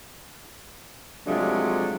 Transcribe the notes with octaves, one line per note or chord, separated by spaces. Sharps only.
C3 F3 F#3 G#3 A3 D4